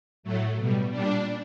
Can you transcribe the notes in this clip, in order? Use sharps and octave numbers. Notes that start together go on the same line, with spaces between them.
A2 F#3 A3
B2 G3
A#2 G3 D4